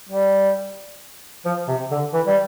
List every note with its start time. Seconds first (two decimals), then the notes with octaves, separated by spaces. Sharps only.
0.09 G3
1.45 F3
1.68 C3
1.91 D3
2.13 E3
2.27 G3